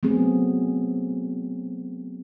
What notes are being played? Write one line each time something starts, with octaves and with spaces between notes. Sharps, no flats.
F#3 A3 B3 C4 G#4